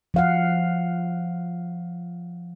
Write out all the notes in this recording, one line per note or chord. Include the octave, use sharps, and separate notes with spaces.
F3 F5 F#5